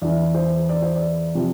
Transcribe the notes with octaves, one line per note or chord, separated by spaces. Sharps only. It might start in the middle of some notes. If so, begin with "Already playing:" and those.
E2 E3 D5
C5
D5
C5
D5
C3 F3